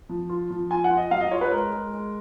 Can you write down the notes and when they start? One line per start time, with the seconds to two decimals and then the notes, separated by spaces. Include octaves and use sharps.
0.09 F3
0.29 F4
0.51 F3
0.71 F4 G#5
0.84 F#5
0.91 F4
0.97 D#5
1.11 F#3 F5
1.21 D#5
1.31 F4 C#5
1.41 B4
1.52 G#3 A#4
1.72 G#3
1.93 G#3